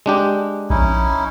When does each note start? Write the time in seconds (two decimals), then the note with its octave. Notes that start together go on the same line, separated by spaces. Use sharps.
0.06 G#3 D4 G4
0.70 A#1 C#4 D#4 E4